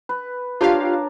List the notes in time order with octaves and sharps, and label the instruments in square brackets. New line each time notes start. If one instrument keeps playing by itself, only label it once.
[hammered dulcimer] B4
[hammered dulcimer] D4 A#4 C#5 [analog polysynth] F4 G4 F5